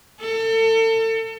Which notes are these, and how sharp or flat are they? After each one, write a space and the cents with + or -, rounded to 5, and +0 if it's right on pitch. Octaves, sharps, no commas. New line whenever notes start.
A4 +35